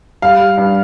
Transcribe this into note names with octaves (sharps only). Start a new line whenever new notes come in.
G3 F5
G3
G2